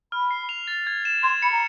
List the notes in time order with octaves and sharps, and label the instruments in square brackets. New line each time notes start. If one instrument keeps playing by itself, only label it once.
[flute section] B5 [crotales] F6
[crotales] C7
F7
A6
G#6
E7
[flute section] C6 [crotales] G#6
[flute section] B5 [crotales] C#7
[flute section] A#5